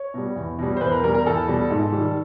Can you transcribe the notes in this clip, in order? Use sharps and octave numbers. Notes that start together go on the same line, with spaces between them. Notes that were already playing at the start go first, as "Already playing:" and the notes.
Already playing: C#5
B2 G3
E2
B2 G3
C5
E2 B4
A#4
B2 G3 A#4
A#4
E2 A4
B2 G3
G#2
D#3 G3